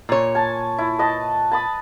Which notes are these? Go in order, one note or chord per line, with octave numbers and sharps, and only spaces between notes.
A#2 C#5
G#5 A5
E4
B4 D#5 A5
A5 B5 D#6